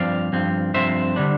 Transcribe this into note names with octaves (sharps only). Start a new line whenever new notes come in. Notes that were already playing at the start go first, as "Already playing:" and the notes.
Already playing: G2 F3 C4 D5 F5
G2 F3 C4
G2 F3 C4 C5 E5
D3 G3 D4